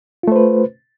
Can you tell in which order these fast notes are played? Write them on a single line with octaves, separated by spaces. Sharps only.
F4 A3 C5 B4